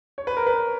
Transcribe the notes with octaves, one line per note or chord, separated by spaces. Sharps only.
C#5
B4
A#4
B4